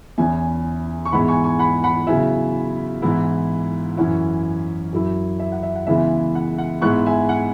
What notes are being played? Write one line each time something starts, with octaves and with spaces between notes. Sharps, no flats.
E2 E3 C#4 E4 E5 G#5
C#6
G#2 E3 G#3 B3 E4 F#5 B5
G#5 C#6
G#5 C#6
F#5 B5
F#5 B5
C#3 F#3 B3 E4 E5 G#5
G#2 E3 B3 E4
F#2 E3 C#4 E4 F#5
F#2 F#3 E4
E5
F#5
E5
F#5
C#3 E3 G#3 B3 E4 E5
F#5
F#5
G#2 G#3 B3 E4 C#6 F#6
E5 G#5
F#5